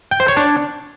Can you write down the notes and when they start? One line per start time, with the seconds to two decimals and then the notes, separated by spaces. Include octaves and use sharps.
0.11 G5
0.20 C5
0.28 C#5
0.37 D4